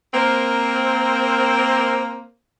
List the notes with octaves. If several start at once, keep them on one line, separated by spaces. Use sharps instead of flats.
A#3 C4 A#4 C5